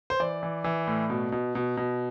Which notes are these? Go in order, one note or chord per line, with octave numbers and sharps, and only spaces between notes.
C5
E3 D5
E3
E3
A2
B2
B2
B2
B2